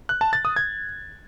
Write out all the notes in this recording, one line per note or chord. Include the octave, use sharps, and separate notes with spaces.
F#6
A5
A6
D#6
G#6